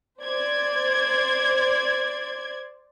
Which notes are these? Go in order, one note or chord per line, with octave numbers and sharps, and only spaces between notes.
C5 D5 G#6